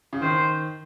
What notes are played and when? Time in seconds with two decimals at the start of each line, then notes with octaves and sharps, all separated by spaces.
0.13 C#3
0.21 D#3 C5